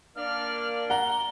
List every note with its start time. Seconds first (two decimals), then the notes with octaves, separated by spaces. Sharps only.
0.16 A#3 D4 D5 F6
0.90 F#5 A#5 G7